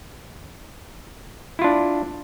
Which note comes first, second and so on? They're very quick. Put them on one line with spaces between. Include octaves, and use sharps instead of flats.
E4 F4 D4